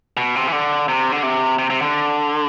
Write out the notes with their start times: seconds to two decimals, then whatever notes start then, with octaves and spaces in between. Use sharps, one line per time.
0.17 B2
0.36 C3
0.48 E3
0.52 D3
0.88 C3
1.12 D3
1.23 C3
1.59 C3
1.70 C3
1.82 D3